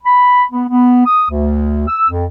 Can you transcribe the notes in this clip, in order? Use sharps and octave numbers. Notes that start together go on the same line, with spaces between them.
B5
B3
B3
D#6
D2
E6
F2